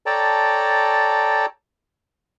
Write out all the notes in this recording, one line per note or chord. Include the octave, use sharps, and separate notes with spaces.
A4 C#5 D5 G5 A5 A#5